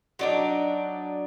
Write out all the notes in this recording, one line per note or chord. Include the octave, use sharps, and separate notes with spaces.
F#3 D4 D#4